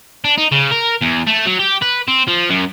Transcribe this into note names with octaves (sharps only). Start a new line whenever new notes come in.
D4
D#4
C#3
A#4
E2
A3
F#3
G4
B4
C4
F3
F#2